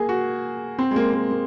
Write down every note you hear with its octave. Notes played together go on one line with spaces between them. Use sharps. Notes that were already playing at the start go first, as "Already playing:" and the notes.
Already playing: A#3 G#4
F#4
C4
G#3
A#3
A#3
A#3